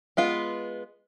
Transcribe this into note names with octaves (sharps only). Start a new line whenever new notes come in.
G#3 B3 F4